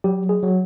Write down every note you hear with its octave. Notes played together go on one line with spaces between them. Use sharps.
F#3 G4
G#4
F#3